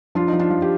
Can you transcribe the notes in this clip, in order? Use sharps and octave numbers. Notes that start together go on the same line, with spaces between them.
F3 D4 F4
D#4
F3
D4 F4
F3
G4